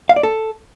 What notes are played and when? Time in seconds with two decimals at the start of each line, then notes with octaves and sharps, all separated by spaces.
0.09 F5
0.16 D5
0.23 A4